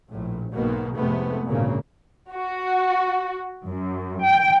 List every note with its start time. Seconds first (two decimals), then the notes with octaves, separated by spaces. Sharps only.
0.10 A#1 A2
0.54 B1 G#2 B2 D#3 A#3
0.95 F1 A2 C3 G#3 A3 B3
1.49 G#1 D2 G2 A#2 C#3 A#3
2.33 F#4
3.68 F#2
4.27 G5